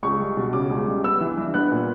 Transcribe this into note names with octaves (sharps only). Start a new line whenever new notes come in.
C#2 C#6
G3
B2
C#3 D6
C#2
G3
B3 E6
E3
G2
B3 F#6
A#2